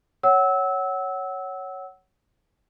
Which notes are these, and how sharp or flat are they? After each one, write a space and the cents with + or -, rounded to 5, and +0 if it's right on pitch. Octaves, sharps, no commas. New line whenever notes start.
C#5 +0 F#5 +20 E6 -20